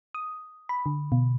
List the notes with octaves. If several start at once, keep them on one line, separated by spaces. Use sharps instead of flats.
D#6
B5
D3
B2